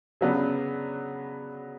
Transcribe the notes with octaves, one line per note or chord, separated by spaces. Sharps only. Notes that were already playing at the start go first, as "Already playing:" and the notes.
C#3 F#3 B3 D4